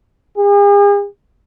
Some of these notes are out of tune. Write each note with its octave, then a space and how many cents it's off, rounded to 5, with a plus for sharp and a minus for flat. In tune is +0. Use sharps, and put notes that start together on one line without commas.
G#4 -45